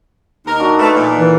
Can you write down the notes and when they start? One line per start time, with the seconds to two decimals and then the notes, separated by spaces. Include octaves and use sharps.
0.46 D#2 D#4 A#4
0.59 D4 F#4
0.79 A3 A4 B4 F5
0.94 A#2 F3
1.17 E3